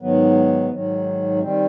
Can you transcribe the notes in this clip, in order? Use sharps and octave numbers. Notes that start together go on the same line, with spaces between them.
G#2 D#3 F#3 B3
G#2 D#3 F#3
D#3 G3 C4